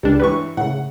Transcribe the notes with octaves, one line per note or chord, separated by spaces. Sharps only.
C#2 G3 D4
G2 E3 G4 B4 C#6
A2 C#3 F#5